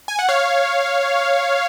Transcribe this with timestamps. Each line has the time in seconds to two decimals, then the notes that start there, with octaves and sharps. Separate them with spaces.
0.08 G#5
0.19 F#5
0.29 C#5 F5